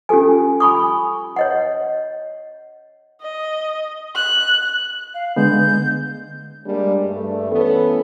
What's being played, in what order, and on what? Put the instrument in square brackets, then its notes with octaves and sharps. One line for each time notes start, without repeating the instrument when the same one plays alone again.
[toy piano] C#4 F4 G4 A4 G#5
G#5 B5 C#6 D#6
C#5 D#5 F#5
[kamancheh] D#5
F#6
[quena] F5
[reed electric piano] D3 G#3 B3 [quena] G6
[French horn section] G3 G#3 A#3 D4
G2 A3
E3 A3 B3 C#4 A4